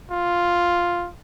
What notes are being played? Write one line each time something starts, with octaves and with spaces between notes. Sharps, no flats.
F4